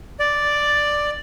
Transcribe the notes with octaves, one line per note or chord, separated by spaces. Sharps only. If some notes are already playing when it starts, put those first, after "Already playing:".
D5